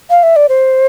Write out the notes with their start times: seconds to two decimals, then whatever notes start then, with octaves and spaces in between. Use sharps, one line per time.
0.10 F5
0.23 E5
0.36 D5
0.49 C5